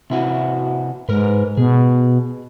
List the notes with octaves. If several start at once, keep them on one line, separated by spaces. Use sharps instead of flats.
C3 E4 F#4
G#2 A#4 B4
B2 G#4